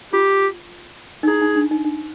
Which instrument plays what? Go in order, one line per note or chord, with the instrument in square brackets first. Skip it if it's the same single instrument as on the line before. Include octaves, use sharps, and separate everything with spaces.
[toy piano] F4 [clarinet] G4
[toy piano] D#4
[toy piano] E4 [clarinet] G#4
[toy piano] D#4
D4
D#4
D#4